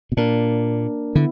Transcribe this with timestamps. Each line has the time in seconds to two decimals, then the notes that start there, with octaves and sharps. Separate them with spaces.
0.12 B2
0.17 A#2 A#3 D4 A#4
1.15 D3 B3 E4